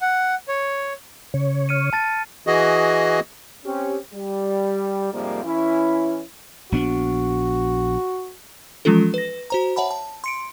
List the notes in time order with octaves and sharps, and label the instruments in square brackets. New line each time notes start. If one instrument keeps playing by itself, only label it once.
[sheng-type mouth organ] F#5
C#5
[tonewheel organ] C#3 C#5
[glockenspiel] F6 C#7 D#7
A5 A6 D#7
[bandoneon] E3 F#4 G#4 D#5
[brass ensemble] C4 C#4 G4
G3
F2 G#2 C3 F3 G3 A#3
E3 C#4 E4
[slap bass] A#1 B3 D4 [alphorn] F#4
[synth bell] E3 F3 G#3 C#4 F4 A4
B4 A#6
F#4 C5 A#5
C#5 E5 F#5 A5 B5
A5
C6 C#7 D7